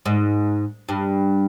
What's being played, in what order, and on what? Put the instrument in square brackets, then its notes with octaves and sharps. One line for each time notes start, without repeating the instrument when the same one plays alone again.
[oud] G#2
G2